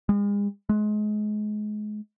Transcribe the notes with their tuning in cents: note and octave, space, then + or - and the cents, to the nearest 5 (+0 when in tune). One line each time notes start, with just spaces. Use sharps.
G#3 -40
G#3 +30